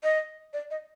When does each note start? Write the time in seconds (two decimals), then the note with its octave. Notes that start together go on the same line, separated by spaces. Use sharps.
0.03 D#5
0.53 D5
0.71 D#5